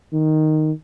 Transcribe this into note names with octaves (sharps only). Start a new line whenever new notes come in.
D#3